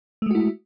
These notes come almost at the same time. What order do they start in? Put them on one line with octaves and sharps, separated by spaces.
A3 G#3 F#4 E4